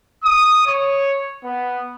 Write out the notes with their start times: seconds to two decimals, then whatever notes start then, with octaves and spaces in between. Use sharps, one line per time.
0.24 D#6
0.67 C#5
1.43 B3